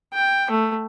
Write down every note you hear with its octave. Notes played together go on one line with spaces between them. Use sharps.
G5
A3